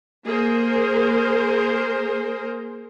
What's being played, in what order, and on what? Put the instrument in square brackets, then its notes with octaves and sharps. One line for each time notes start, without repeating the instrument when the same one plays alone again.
[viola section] A#3 G#4 A#4 C5